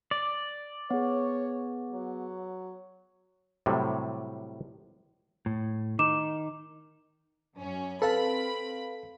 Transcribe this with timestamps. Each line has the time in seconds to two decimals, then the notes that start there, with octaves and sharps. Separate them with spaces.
0.11 D5
0.90 B3 G#4 C#5
1.92 F#3
3.66 A2 C3 F#3 G3
5.46 A2
5.99 D#3 D#4 D6 E7
7.56 F#2 C#4
8.02 C4 A4 B4 F5 A5 B5